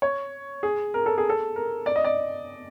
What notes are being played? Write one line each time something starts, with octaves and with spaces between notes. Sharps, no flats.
C#5
G#4
A#4
A4
G#4
A4
A#4
D5
D#5
D5